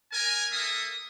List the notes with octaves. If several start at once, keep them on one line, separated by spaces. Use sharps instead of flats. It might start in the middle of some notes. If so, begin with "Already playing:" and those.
A#4 G#5
A#3 A4 E5 D#6